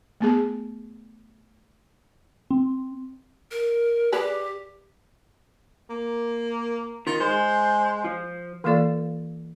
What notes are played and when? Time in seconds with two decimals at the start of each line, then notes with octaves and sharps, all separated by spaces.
0.21 A3 B3 G#4
2.51 C4
3.51 A#4
4.12 G4 G#4 B4 D5
5.90 A#3
7.07 D#3 F4
7.20 G#3 C5
8.04 F3
8.64 E3 A#3 F4 A4 D5 F5